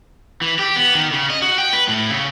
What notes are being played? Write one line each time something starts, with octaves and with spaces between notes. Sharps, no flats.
E3
G4
B3
D#3
C#3
D#5
F#4
G5
B4
A2
C#3